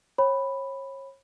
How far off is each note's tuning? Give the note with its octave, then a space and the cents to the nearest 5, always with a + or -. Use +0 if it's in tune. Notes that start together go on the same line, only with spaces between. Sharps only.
C#5 -35 G5 +0 B5 +0